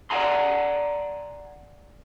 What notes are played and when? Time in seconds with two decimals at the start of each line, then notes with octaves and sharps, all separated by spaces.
0.10 D5 E5 F#5 G#5 A#5 C6